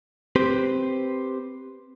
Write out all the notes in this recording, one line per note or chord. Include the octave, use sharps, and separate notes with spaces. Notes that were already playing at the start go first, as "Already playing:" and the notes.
C4 G4 B4 C5